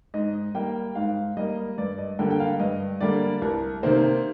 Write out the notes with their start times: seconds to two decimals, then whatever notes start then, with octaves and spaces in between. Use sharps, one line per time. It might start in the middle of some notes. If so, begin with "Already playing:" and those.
0.14 G#2 D#5
0.55 G3 A#3 G5
0.95 G#2 F5
1.37 G3 A#3 D#5
1.78 G2 D5
1.98 D#5
2.19 D3 G3 A#3 G5
2.31 G5
2.40 F5
2.59 G2 D#5
3.01 D3 G3 A#3 D5
3.42 C2 A#4
3.83 C3 D#3 A#3 C5